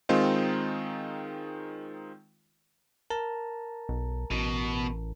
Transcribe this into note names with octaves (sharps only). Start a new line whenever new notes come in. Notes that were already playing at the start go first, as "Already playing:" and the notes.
D#3 G#3 C4 D#4 F4
A#4 A5 A#5
B1
A1 B2